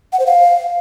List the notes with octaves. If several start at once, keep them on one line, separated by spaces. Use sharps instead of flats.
F#5
C5
F5